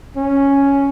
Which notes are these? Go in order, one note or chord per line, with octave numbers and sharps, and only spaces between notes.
C#4